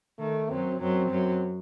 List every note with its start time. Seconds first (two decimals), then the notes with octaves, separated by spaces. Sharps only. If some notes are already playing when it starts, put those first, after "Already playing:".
0.19 D#3 A3
0.50 F#2 F#3 C4
0.80 F#2 F#3 C4
1.10 F#2 F#3